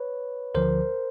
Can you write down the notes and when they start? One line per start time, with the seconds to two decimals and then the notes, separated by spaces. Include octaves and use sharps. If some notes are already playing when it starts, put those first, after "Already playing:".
Already playing: B4 C#5
0.55 D2 D3 F3 A#4 C5